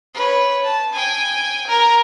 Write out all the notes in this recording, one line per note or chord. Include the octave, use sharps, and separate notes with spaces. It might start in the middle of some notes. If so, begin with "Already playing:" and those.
B4 C#5
A5
G5 G#5
A#4 A#5